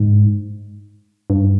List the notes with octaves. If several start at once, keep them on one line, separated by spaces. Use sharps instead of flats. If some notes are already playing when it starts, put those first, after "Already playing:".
Already playing: G#2
G2